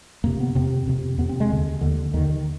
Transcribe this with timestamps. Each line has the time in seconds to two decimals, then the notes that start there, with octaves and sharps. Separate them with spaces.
0.24 F2 C3 A#3
0.40 B3
0.55 F2 C3 C4
0.87 F2 C3
1.18 F2 C3 B3
1.29 C4
1.40 G#3
1.50 D#2 D3
1.81 D#2 D3
2.14 D#2 D3 D#3
2.30 D#3